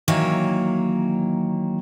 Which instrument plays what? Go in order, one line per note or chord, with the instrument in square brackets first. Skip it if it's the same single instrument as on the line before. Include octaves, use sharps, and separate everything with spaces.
[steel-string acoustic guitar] D#3 E3 F#3 A#3 C#5